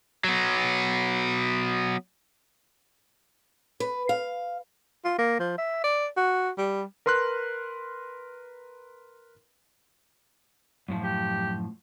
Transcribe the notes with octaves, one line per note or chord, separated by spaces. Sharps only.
F#3 B3
B4
F5
F4
A#3
F3
E5
D5
F#4
G3
A#4 B4 C6 F6 F#6
F#2 A2 F3
G4